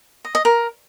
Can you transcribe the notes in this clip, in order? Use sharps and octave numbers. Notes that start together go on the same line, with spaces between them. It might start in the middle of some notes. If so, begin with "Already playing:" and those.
D#5
D#5
A#4